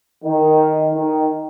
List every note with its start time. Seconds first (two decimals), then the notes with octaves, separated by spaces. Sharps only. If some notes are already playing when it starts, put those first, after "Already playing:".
0.23 D#3
0.94 D#3